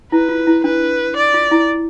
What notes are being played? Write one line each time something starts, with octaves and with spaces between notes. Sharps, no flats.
E4 B4
F4
E4
D4 B4
D5
F4
E4